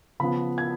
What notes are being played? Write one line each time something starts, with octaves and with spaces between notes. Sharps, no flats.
C#3 F3 B3 B5
G#6